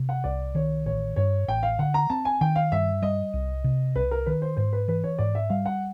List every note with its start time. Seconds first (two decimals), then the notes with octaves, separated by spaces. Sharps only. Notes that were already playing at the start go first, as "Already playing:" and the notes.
Already playing: C3
0.09 F#5
0.24 C2 D5
0.55 D#3 C#5
0.86 A1 C#5
1.16 G2 C#5
1.48 A1 G5
1.63 F5
1.79 D3 F#5
1.94 A#5
2.10 C4 A5
2.25 G#5
2.41 D#3 G5
2.56 F5
2.72 G2 E5
3.02 G3 D#5
3.34 C2
3.64 C3
3.95 C2 B4
4.11 A#4
4.26 D#3 B4
4.42 C5
4.57 G#2 C5
4.73 B4
4.88 E3 B4
5.04 C#5
5.19 G#2 D5
5.35 E5
5.50 G3 F5
5.66 F#5